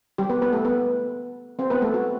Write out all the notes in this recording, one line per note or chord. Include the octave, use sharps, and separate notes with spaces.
G3 G4
B3 B4
B3 B4
A3 A4
B3 B4
C4 C5
B3 B4
A3 A4
F#4